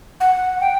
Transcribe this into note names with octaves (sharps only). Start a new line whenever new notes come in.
F#5
G5